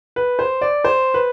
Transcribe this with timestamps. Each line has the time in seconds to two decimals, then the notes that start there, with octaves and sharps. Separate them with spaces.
0.16 B4
0.39 C5
0.61 D5
0.84 C5
1.14 B4